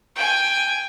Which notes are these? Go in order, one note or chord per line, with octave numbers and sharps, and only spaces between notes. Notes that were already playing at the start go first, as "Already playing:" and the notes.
G5 G#5